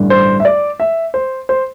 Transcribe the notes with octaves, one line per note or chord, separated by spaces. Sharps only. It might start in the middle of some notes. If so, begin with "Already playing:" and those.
Already playing: A1 G2 D3 G3
C5
E5
D5
E5
C5
C5